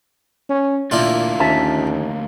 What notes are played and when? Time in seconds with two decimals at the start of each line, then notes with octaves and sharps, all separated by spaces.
0.49 C#4
0.91 D2 A#2 A#3 D4 E4 F4
1.40 D#2 C#4 E5 A5